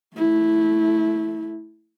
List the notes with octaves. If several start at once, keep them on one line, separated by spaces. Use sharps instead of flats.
A3 E4